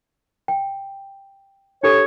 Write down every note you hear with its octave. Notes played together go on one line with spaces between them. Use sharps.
G5
D4 G4 A4 C#5